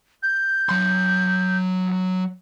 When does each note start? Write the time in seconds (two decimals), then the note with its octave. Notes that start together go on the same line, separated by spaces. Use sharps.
0.23 G6
0.69 F#3 C6